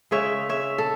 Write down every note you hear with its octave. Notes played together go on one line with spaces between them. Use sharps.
C#3 G#3 C#4 C#5 E5
C#5 E5
A4